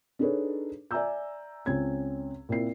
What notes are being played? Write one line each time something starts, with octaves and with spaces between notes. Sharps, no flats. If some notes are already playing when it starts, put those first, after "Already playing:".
D4 D#4 G#4 A4 B4 C#5
D5 E5 G#5 A#5 E6 G6
C#2 C4 C#4 G#6
A#2 C4 E4 C7